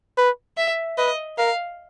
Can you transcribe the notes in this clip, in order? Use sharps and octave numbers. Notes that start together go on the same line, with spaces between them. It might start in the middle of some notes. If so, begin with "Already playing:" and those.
B4
E5
B4 D#5
A#4 F5